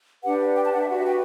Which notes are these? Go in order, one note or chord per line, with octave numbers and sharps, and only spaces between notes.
D4 G4 B4 F#5
G5
A5
F#5
E5
F#4 B4 F#5
E5
G5